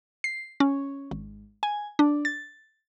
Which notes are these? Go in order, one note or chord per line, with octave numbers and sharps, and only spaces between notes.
C7
C#4
G#1
G#5
D4
A6